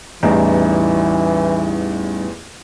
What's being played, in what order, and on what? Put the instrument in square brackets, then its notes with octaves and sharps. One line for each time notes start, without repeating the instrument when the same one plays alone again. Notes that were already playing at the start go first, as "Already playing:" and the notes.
[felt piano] A1 E2 [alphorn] E3 [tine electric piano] G3 C#4 D#4